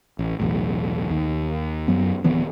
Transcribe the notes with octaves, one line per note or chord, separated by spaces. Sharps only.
A1
B1 E2 A2
D#2
F#2 F#3 B3
D1 D#3 E3 B3